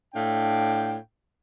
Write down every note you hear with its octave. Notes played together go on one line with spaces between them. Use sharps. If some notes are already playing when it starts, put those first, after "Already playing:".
A2 D4 F5 G5